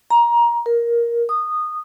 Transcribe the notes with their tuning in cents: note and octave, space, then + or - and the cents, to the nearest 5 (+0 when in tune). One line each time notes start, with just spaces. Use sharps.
A#5 +20
A#4 +10
D#6 -15